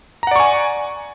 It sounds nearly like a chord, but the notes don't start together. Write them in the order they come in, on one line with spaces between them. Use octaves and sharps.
A#5 F#5 D5 C#6 G#5